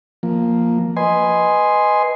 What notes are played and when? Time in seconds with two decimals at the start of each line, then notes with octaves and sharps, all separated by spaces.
0.23 F3 A#3
0.97 B4 D#5 G#5 C6